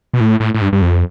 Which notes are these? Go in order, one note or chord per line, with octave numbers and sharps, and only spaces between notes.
B2
A2
A2
A2
G2
G2
F2